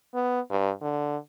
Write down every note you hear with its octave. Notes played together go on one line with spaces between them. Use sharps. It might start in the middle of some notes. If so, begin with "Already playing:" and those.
B3
G2
D3